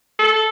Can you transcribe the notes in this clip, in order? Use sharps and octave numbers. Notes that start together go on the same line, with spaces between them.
A4